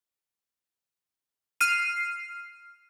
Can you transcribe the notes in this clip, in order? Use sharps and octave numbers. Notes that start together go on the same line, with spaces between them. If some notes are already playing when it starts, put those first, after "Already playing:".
F6 C7 D#7